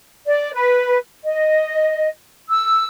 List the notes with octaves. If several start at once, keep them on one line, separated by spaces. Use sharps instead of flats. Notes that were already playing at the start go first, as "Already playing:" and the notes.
D5
B4
D#5
E6